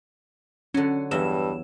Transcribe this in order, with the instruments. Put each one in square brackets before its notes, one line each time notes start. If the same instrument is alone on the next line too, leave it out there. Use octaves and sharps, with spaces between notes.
[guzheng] D3 F#3 [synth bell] C#4
[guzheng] E2 E3 F#3 [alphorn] G2 [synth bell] E6 E7